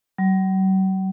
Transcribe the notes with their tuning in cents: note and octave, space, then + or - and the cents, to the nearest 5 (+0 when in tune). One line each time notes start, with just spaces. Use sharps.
F#3 +45